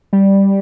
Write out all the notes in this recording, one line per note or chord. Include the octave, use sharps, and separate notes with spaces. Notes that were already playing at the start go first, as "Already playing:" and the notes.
G3